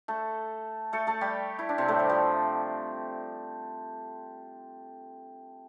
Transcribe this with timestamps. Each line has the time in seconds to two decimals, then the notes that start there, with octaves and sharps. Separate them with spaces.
0.08 A3 A4
0.93 A3 A4
1.07 A3 A4
1.21 G3 G4
1.59 E4
1.69 D4
1.78 C3 C4
1.88 A2 A3
1.99 G3
2.09 F3